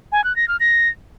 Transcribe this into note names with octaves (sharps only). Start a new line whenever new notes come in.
G#5
F#6
A#6
F6
A#6